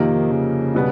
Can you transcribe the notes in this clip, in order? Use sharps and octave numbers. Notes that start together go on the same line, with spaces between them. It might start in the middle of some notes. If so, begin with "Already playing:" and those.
Already playing: F2 C3 D#3 F3 A#3 D#4
C#3
B2 G3 B3